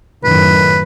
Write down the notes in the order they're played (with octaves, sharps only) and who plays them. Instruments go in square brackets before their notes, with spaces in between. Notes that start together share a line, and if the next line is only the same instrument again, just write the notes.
[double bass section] F#2 A2 D#3 [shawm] B4